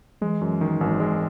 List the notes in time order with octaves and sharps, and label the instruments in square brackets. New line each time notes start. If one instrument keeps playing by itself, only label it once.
[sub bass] E3 [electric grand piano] G#3
[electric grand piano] F#2
D#3
G#1
G#3